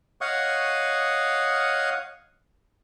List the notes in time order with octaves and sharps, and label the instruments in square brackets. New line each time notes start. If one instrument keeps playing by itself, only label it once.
[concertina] C#5 D#5 F5 F#5 C#6 D#6